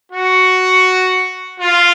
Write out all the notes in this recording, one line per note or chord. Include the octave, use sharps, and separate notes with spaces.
F#4
F4